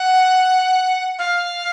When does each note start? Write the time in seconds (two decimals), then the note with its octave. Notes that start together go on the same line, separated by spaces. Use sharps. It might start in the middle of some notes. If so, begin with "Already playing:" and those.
Already playing: F#5
1.19 F5